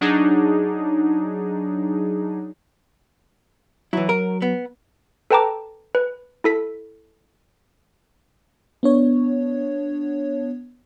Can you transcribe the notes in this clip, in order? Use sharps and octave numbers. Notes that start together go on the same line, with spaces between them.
F#3 D4 D#4 G#4
E3 F#3 E4
A#4
B3
A4 B4 G5 A5 A#5 D6
B4
E4 A4 B6
B3 D4 C#5